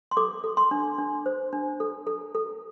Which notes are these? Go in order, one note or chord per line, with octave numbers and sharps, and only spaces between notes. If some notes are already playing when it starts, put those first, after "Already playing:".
C6
A4 D6
A4
C6
D4
D4
C5
D4
A4
A4
A4